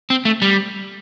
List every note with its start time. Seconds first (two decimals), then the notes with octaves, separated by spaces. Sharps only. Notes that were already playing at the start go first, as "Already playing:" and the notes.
0.10 C4
0.25 A3
0.42 G3